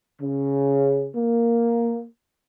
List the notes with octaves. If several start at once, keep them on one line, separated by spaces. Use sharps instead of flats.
C#3
A#3